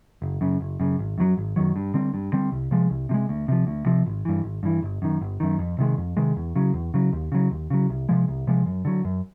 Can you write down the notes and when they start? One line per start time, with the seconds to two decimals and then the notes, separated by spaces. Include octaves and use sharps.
0.22 F#1
0.41 F#2 C#3
0.60 F#1
0.80 F#2 C#3
0.99 G#1
1.18 F#2 D#3 F#3
1.37 G#1
1.56 F#2 D#3 F#3
1.76 G2
1.94 D3 G3 C4
2.14 G2
2.33 D3 G3 C4
2.52 C2
2.71 C3 F3 G#3
2.90 C2
3.09 C3 F3
3.14 G#3
3.29 D2
3.48 C3 F3
3.67 D2
3.86 C3 F3
4.06 G#1
4.25 G2 E3
4.44 G#1
4.63 G2 E3
4.83 G1
5.02 F#2 D#3
5.21 G1
5.40 F#2 D#3
5.59 F2
5.78 C3 D#3 G#3
5.98 F2
6.17 C3 D#3 G#3
6.36 E2
6.56 C#3 F#3
6.74 E2
6.94 C#3 F#3
7.13 D#2
7.32 C#3 F#3
7.51 D#2
7.70 C#3 F#3
7.89 C2
8.09 C3 F3 G#3
8.28 C2
8.47 C3 F3 G#3
8.66 F#2
8.85 D3 F#3
9.05 F#2